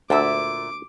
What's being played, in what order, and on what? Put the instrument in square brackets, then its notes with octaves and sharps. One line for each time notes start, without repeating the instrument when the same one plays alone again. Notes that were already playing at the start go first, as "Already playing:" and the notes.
[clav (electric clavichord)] D2 [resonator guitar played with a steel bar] A#2 E5 [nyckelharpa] D6